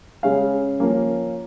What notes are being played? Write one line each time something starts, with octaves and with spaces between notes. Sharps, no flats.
C#3 G#3 C#4 F5
F3 A#3 C#4